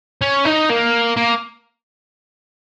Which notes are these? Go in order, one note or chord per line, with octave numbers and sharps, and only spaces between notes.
C#4
D#4
A#3
A#3